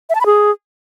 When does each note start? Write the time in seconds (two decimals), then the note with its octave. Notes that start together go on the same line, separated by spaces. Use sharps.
0.10 E5
0.15 A5
0.21 B5
0.26 G#4